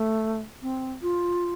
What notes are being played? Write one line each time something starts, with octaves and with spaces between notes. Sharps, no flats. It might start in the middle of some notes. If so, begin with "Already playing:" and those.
Already playing: A3
C4
F4